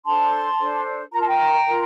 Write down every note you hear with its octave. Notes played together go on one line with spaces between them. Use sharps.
D4 A4 C5 A5 C6
D4 A4 C5
F4 A#4 A#5
A5
G5 A#5
F4 A#4